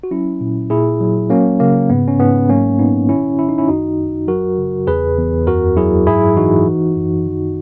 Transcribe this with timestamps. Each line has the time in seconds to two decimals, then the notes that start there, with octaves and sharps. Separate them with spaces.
0.03 F#4
0.11 F#3 C#4 E4
0.41 A#2
0.70 A#2 E4 G#4
1.00 F#3
1.30 F#3 A#3 C#4
1.60 C#3 A#3
1.90 G#2 B3
2.08 C#4
2.20 G#2 B3
2.49 F#3 A#3 C#4
2.79 A#2 B3 D#4
3.09 D#3 C#4 E4
3.39 D#3 E4
3.49 D#4
3.58 C#4 E4
3.68 F#2 D#4 F#4
3.98 F#2
4.28 F#3 F#4 A#4
4.58 C#3
4.87 E2 G#4 B4
5.17 E2
5.47 F#2 F#4 A#4
5.77 F#3 E4 G#4
6.07 G#2 E4 G#4
6.37 E3 D#4 F#4
6.66 E3
6.96 F#2
7.26 D#3